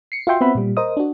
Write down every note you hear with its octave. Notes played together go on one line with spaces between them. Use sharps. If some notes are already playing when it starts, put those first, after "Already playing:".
C7 C#7
F4 F#4 E5 G5 C6
B3 C4 B4 E5 F#5 B5
A#2 G3
A#4 C5 D#5 D#6
D4 F#4